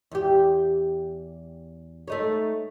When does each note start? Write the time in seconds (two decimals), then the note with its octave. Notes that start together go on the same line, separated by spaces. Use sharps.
0.11 E2 G4
2.08 A3 D#4 C#5